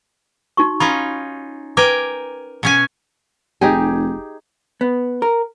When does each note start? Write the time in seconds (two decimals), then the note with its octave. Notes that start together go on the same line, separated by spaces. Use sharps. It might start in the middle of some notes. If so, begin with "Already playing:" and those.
0.57 D#4 F#4 C#6
0.80 C#4 D#4 F4 B5
1.77 A#4 B4 G5 G#5 D6
2.63 B2 C#4 G#5
3.61 F1 D#4 G4 G#4
4.81 B3
5.22 A#4